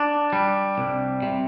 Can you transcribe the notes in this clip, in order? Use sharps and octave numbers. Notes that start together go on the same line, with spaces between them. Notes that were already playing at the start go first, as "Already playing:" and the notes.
Already playing: D4
G3
C2
C3